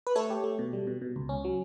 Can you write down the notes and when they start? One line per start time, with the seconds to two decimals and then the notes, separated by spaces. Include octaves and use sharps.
0.07 B4
0.15 A3 A4 C#5
0.30 G4
0.44 A3
0.59 B2
0.73 G3
0.87 B2
1.02 B2
1.16 C#2
1.29 C#4
1.45 F#3